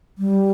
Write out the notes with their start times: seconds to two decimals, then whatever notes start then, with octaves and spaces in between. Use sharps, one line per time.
0.18 G3